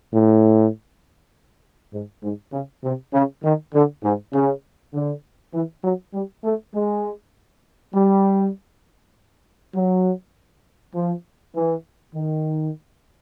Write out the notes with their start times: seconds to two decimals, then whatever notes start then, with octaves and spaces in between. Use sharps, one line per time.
0.13 A2
1.93 G#2
2.23 G#2
2.53 C#3
2.84 C3
3.13 C#3
3.44 D#3
3.74 D3
4.03 G#2
4.33 C#3
4.94 D3
5.54 E3
5.84 F#3
6.14 G3
6.44 A3
6.74 G#3
7.94 G3
9.74 F#3
10.95 F3
11.55 E3
12.15 D#3